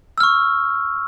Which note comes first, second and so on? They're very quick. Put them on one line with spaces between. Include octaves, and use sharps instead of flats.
E6 F6 C#6